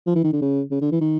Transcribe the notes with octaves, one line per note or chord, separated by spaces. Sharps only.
F3
E3
D#3
D3
C#3
C#3
D3
E3
D#3